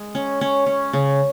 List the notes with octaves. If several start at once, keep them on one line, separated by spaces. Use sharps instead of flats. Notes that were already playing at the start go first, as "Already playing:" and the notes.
Already playing: G#3
C#4
C#4
C#4
C#3